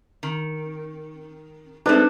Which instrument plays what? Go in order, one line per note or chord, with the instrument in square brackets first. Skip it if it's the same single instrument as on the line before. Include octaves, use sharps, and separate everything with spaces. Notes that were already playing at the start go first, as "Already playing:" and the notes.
[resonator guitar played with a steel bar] D#3
[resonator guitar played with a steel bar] G#3 A3 C4 [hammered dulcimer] D4 [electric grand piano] D#4 B4